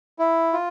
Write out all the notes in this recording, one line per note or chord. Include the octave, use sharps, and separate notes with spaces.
E4
F4